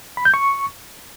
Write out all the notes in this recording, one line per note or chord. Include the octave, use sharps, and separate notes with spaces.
B5
G6
C#6